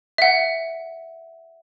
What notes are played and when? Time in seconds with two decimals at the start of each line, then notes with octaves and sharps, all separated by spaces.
0.18 E5 F#5